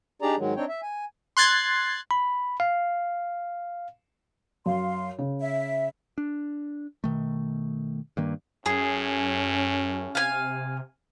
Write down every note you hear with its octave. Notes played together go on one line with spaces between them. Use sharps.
D4 D#4 G4 G#4 D5 A#5
G#2 D#3 F#3 G#3
C4 D4 D#4 C#5 G5
E5
G#5
C6 F#6 G#6 A6 C7
B5
F5
F#2 F5 C6
C#3
E5
D4
B2 D#3 A3
G2 D#3 A#3
F#2 A2 C#4 G#4
C3 F5 G#5